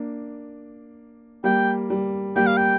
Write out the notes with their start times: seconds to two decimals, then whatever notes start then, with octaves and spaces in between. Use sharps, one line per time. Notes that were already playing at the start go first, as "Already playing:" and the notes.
Already playing: A#3 D4
1.44 G3 A#3 G5
1.90 G3
2.36 G3 A#3 G5
2.47 F5
2.57 G5